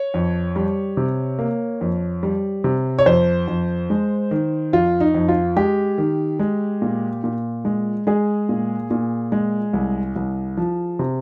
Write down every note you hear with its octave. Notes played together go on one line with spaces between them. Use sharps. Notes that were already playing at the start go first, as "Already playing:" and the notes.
Already playing: C#5
F2
G3
C3
A#3
F2
G3
C3
C#5
F2 C5
F2
G#3
D#3
F2 F4
D#4
F2
F4
G#3 G4
D#3
G#3
A#2
A#2
G#3
G#3 G#4
A#2
A#2
G#3
C2
C2
F3
C3